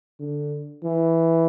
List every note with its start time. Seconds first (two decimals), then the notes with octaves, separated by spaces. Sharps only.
0.20 D3
0.84 E3